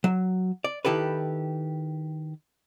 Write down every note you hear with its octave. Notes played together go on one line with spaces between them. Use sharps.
F#3
D5
D#3 E4 G4 A4 B4